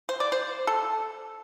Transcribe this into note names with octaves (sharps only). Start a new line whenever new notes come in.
C5
D5
C5
A4